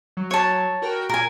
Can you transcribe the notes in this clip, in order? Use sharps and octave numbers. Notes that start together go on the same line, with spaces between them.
F#3
C#5 A5
F#4 A#4 G5
A#2 A#4 G#5